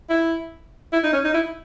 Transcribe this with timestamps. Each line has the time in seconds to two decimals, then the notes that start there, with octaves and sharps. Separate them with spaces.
0.10 E4
0.93 E4
1.04 D#4
1.13 C#4
1.24 D#4
1.34 E4